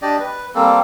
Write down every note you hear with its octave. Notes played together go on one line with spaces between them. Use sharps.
D4 G4 D5 D#5
B4
G3 A#3 C4 A4